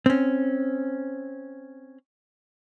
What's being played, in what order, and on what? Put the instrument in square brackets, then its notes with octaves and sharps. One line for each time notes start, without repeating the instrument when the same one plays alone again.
[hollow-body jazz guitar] C4 C#4